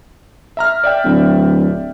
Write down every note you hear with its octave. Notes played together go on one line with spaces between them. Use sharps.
E5 A#5 F6
D5 E5 G5
D1